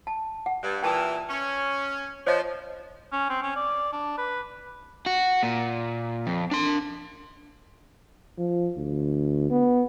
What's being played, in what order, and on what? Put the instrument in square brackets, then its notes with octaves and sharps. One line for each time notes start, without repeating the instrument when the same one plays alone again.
[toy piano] A5
F#5
[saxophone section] G2
[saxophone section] A#2 E3 [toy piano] G5 A5 D#6
[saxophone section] C#4
[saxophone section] F3 [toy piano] C5 C#5 D#5
[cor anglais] C#4
C4
C#4
D5
D4
B4
[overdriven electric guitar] F#4
A#2
F2
D4 C6
[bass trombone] F3
D2
B3